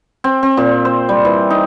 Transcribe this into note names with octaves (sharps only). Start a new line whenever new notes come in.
C4
C4
A#2
C5
G3
E3
D#4